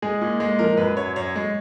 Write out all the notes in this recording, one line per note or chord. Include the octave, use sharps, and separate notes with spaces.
G#3 G#4
A#2
G#3
F3 A#4
F#2 B4
F#2 C#5
F#2 C#5
G#3